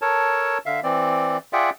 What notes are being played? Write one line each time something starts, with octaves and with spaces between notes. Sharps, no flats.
A4 A#4 C#5 A5
D3 E5 F5
E3 C4 D5
F4 G#4 D5 E5 F#5 G5